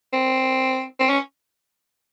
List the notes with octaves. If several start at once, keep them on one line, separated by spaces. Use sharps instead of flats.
C4
C4
C#4